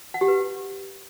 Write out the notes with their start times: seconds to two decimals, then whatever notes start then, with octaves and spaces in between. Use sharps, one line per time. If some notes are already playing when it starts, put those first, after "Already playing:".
0.14 F#5
0.21 G4
0.28 B4